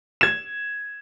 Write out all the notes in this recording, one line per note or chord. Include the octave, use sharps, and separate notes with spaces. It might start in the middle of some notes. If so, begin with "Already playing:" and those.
G#6 E7